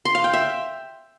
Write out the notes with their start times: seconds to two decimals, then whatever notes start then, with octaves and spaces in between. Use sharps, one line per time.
0.05 C6
0.15 F5
0.24 G5
0.33 E5